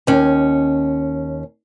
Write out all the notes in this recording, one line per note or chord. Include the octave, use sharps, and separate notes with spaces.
D#2 C#4